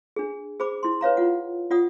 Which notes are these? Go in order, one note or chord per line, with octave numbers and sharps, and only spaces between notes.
D4 G#4
G#4 C5 B5 D6
E4 C6
B4 C#5 F5 A#5
F4 F#5
F4 D5 F#5 D#6